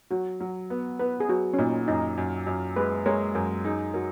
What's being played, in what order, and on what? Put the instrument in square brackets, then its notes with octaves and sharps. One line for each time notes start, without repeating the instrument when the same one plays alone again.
[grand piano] F#3 [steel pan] F#4
[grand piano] F#3
B3
[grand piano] B3 [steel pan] B4
[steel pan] G#4
[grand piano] F#3 [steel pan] F#4
[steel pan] C#4
[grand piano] A#2 [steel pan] D#4
[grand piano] F#2 [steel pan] D#4
[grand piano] F#2
F#2
[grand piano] G#3 [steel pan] B4
[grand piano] G#3 [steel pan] A#4 C#5
[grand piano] F#2 [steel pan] A#4
[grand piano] D#4 [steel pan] G#4
[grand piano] F#3 [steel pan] A#4